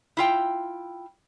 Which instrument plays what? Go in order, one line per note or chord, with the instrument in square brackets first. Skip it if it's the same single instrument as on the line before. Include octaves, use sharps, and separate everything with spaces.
[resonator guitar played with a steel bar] E4 F4 G5